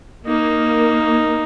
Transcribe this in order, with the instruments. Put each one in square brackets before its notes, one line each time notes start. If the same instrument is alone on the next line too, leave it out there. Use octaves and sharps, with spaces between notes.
[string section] A#3 [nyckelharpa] D#4